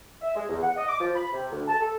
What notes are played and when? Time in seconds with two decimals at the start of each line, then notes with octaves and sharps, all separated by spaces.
0.22 E5
0.35 G#3
0.49 E2
0.62 F#5
0.77 D#5
0.88 D6
0.99 F3
1.15 B5
1.33 C3
1.52 D2
1.68 A5
1.80 A4